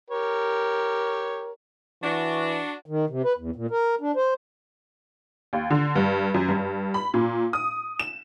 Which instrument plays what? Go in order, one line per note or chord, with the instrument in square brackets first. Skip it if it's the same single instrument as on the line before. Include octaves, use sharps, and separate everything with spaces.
[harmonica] G4 C#5 [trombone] A#4
[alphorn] E3 [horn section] D4 F#4
[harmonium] D#3
C3
B4
E2
A#2
A#4
D4
C5
[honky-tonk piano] D#2
D3
G2
F#2
G2
B5
A#2
D#6
E7